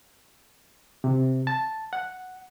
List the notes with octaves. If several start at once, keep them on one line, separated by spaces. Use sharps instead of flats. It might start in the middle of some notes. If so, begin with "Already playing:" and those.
C3
A5
F#5